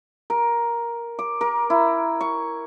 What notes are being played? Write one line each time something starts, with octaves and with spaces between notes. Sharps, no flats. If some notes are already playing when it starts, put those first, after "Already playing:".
A#4
D6
A#4
E4
C#6